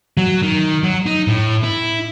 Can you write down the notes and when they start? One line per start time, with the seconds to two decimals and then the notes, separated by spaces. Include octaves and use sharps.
0.17 F#3
0.42 D#3
0.83 F#3
1.06 D#4
1.28 A2
1.64 E4